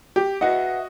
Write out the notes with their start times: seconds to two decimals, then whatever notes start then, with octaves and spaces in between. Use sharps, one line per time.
0.16 G4
0.41 F#4 B4 D#5 E5 F#5